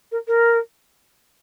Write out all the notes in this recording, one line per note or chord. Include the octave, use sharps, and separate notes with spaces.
A#4
A#4